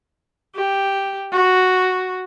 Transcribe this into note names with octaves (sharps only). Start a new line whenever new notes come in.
G4
F#4